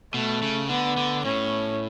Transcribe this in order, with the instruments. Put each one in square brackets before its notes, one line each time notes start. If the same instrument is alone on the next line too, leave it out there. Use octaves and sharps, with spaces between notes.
[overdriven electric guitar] B2 [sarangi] A3
[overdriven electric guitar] C#3
[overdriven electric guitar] D3 [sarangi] B3
[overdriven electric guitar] D3
[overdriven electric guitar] A2 [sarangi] C#4